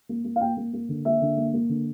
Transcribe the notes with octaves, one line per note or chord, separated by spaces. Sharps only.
A#3
A#3
F5
A#3 G5
A#3
A#3
D3
A#3 E5
D3
A#3
A#3
D3